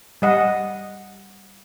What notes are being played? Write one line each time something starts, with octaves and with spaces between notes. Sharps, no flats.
G3 D#5 F#5